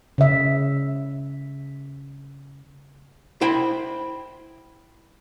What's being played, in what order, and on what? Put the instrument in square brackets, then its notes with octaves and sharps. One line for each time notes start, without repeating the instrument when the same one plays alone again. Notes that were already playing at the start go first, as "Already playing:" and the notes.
[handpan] C#3 E5
[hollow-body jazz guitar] E4 C5 G5 B5